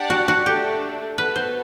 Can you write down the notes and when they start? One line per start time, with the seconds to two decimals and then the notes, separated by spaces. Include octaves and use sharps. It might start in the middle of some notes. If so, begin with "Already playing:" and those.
Already playing: D4 G4 D5 F#5
0.10 F#4
0.28 F#4
0.46 A3 D4 G4 A4
1.18 B3 F#4 A4 B4
1.36 C5